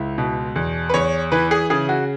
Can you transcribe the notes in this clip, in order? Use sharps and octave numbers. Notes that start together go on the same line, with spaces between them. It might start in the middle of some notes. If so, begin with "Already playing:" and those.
Already playing: C#2 E4
B2
E2
B4
E2 C#5
E3 B4
G#4
C#3 G#4
F#4